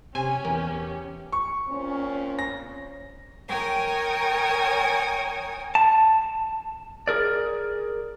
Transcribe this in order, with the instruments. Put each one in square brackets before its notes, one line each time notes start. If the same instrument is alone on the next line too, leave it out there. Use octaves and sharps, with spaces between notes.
[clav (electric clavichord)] C3 C5 [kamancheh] C#4 G4 [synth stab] G#5
[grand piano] E2 [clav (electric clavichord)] A#4
[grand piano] C#6
[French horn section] A#2 C4 C#4
[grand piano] A#6
[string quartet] A#4 C#5 G5 G#5 C#6 D#6
[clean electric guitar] A5
G#4 A#4 D5